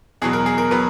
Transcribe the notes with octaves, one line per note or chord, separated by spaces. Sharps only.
E2 B2 F#3 G#4
A#4
G#4
A#4
B2 F#3 B4